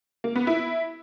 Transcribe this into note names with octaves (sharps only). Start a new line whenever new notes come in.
A#3
B3
E4